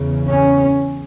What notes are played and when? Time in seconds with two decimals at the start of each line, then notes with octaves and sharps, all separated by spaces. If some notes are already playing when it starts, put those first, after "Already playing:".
Already playing: E2 C#3
0.29 C#4